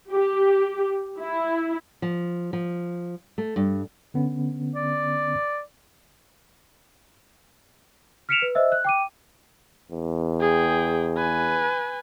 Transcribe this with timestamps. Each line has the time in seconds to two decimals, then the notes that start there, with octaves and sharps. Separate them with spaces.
0.11 G4
1.19 E4
2.02 F3
2.53 F3
3.38 A3
3.56 G2
4.14 D3 B3 C#4
4.75 D5
8.29 F6 B6 C#7 D7 E7 F7
8.42 B4
8.55 C5 D#5 E5 E6
8.72 F#6
8.85 G5 D6 D#7
9.91 E2
10.41 G#4 G5
11.17 B4 G#5